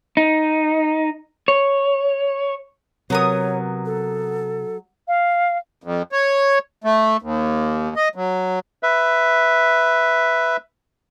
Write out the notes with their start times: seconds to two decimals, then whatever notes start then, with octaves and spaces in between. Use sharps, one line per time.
0.17 D#4
1.48 C#5
3.10 C3 F#3 B3 A#4 C#5 D#6
3.86 A4
5.08 F5
5.84 F2
6.12 C#5
6.84 A3
7.22 D#2
7.96 D#5
8.15 F#3
8.83 B4 E5